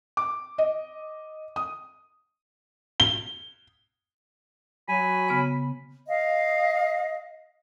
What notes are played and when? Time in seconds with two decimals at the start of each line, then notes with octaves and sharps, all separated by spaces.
0.17 D6
0.58 D#5
1.56 D#6
3.00 G7
4.89 F#3 G#5 B5
5.28 C#3 B3 C#5
6.09 D#5 F5